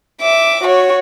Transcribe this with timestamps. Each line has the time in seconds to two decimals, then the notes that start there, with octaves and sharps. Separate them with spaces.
0.21 E5 D6
0.63 F#4 C#5